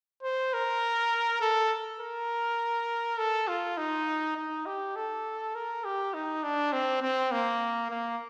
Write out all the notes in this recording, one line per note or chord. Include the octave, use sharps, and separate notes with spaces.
C5
A#4
A4
A#4
A4
F4
D#4
D#4
G4
A4
A#4
G4
D#4
D4
C4
C4
A#3
A#3